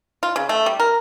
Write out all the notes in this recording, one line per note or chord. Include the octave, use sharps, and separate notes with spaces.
F4
C#3
A3
G3
A#4